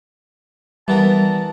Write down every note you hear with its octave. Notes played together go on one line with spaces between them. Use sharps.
E3 G3 B3 A#4 A5